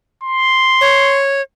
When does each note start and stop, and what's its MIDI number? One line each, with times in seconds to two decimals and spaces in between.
0.23 1.23 84
0.81 1.41 73